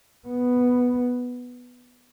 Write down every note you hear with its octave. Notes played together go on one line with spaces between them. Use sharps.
B3